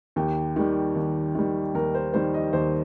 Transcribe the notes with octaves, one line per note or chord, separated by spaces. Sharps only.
D#2 G4
D#3 G3
D#2
D#3 G3
D#2 A#4
C5
D#3 G3 C5
D#5
D#2 C5